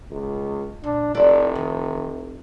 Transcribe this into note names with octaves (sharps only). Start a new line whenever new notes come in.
C#2
A#2 D4
F1 E4 F#4 D5
D#3